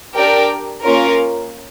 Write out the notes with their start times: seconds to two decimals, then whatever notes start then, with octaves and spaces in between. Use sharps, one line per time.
0.14 D4 G4 A#4 D5 G5
0.85 A#3 C#4 F4 A#4